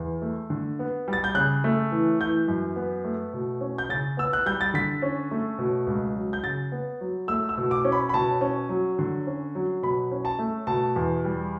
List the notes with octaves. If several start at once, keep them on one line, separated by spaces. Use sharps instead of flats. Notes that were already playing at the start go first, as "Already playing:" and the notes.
Already playing: E2
A3
D3
B3
G3
A6
G6
C#3 F#6
A3
E3
E3 G6
F#2
B3
A3
B2
C#4
G6
C#3 A6
B3 E6
F#6
G3 G6
A6
D3 B6
C#4
A3
B2
C#2
F#3
G6
C#3 A6
B3
F#3
A3 E6
E6
B2
D6
C#4
B5
B5
B2 A5
C#4
F#3
D3
C#4
F#3
B2 B5
C#4
A5
A3
B2 A5
E2
G3